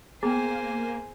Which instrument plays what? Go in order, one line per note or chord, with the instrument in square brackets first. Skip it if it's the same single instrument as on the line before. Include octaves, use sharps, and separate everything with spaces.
[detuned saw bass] A#3 [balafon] B3 G5 [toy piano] G#4 A#5 [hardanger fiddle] C5 G#5